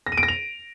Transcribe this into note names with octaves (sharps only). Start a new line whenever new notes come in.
A#6
D#7
D7
A#6
F7